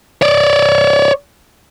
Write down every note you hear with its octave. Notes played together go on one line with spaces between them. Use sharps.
C#5 D5